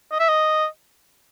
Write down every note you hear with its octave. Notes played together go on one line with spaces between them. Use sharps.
D#5
E5
D#5